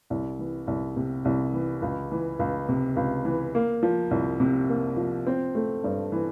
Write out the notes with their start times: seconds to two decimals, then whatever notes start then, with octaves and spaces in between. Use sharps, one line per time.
0.10 C2
0.39 E3
0.67 C2
0.96 C3
1.25 C2
1.53 E3
1.82 C#2
2.12 E3
2.39 C#2
2.69 C3
2.96 C#2
3.25 E3
3.55 A#3
3.83 F3
4.11 C2
4.40 C3
4.69 A#3
4.97 F3
5.27 C4
5.55 A3
5.84 G2
6.12 E3